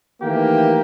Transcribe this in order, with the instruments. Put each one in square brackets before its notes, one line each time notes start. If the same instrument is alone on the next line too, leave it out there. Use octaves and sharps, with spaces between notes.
[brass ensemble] D#3 E3 A3 A#3 G4